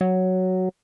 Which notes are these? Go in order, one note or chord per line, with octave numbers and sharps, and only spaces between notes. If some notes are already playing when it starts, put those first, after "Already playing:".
F#3